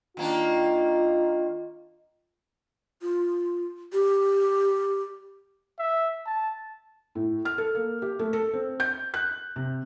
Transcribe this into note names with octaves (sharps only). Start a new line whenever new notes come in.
D#3 A#3 D4 F4
F4
G4
E5
A5
A2
F6
A4
A#3
G4
A3
A4
C4
G6
F#6
C3